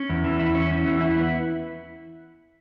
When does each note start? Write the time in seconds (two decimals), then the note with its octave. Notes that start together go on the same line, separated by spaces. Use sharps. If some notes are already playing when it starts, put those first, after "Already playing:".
Already playing: C#4
0.09 E2
0.24 E3
0.40 E4
0.55 C#4
0.70 E2
0.86 E3
1.01 E4
1.16 B3